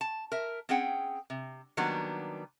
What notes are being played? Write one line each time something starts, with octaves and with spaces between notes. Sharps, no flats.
A5
A#4 E5
C4 C#4 G#4 F#5 G5
C3
D#3 F#3 G3 A#3 B3 D4